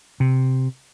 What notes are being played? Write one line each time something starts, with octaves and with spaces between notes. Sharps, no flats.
C3